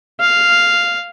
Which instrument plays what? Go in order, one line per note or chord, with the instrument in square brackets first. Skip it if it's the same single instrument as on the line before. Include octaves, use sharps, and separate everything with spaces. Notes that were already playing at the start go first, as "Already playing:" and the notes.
[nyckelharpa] F5